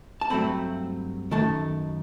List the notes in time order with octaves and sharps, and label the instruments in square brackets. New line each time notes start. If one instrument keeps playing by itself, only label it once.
[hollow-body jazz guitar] A5
G2 F#3 A3 C4 B5
F#2 D#3 A3 A5